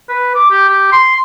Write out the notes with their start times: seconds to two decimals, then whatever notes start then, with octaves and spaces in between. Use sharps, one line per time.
0.09 B4
0.35 D6
0.51 G4
0.69 G4
0.92 C6